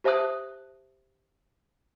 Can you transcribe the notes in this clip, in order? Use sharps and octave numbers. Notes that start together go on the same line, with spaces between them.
G4 C5 E5 A5 D#6 F#6